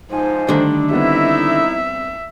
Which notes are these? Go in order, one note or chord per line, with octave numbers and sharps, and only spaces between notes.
G#2 F3 D#4 C5 G#5
D3 D#3 G3 A3 D4
G3 B3 C4 D#4 E4 E5